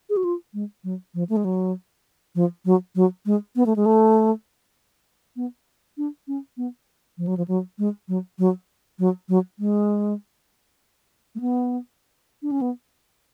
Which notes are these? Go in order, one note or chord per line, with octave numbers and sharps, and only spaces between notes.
G#4
F#4
F4
G#3
F#3
F3
A3
G#3
F#3
F3
F#3
F#3
G#3
B3
A3
G#3
A3
B3
D4
C#4
B3
F3
F#3
F3
F#3
G#3
F#3
F#3
F#3
F#3
G#3
A3
B3
D4
C#4
B3